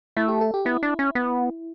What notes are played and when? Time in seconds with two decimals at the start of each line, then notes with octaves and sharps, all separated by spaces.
0.17 A3 E4
0.28 G4
0.41 A4
0.54 G4
0.65 B3 E4
0.83 D4
0.99 C#4
1.15 B3